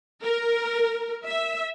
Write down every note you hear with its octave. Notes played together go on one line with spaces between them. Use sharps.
A#4
E5